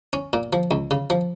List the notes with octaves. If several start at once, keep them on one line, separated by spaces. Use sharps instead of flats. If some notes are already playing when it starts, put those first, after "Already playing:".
C#4
A#2
F3
C#2
C#3
F3